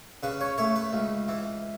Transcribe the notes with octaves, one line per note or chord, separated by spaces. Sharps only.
C#3 B4
C#5
A3 C#5
B4
C#2
E3